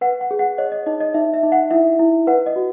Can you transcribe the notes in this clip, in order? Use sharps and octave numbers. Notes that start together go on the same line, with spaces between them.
B4 F#5
F#5
G#4
F#5
C#5 D#5
D#5
D#4 D#5
D#5
D#4 E5
E5
D#4
F#5
E4 E5
E4
B4 F#5
D#5
F#4